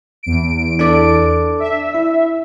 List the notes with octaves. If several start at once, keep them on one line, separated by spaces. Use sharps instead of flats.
E2 D7
D4 A4 D5
E5
E4